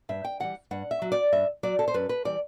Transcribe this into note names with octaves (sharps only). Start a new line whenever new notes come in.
G2 E5
G5
E3 G3 F#5
G2 F#5
E5
F#3
D5
G2 E5
F#3 D5
A4
C5
F#2 B4
B4
E3 G3 D5